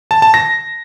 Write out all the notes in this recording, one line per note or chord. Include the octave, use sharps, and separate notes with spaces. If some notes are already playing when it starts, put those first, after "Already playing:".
A5
A5
A#6